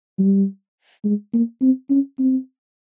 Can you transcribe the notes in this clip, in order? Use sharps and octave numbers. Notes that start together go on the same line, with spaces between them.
G3
G#3
A#3
C4
C#4
C4